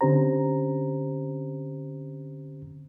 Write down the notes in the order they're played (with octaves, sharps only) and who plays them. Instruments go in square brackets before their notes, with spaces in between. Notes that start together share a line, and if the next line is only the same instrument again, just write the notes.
[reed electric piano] D3 C4 C#4 G4 C5 A#5